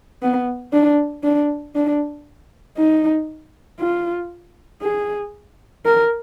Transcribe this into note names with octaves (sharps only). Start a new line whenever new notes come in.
B3
D4
D4
D4
D#4
F4
G#4
A#4